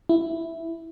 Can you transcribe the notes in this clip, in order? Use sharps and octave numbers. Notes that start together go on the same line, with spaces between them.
E4